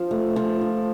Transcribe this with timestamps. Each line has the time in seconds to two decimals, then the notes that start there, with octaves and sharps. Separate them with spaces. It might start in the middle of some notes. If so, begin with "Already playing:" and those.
Already playing: F3
0.11 A3
0.36 F3
0.61 F3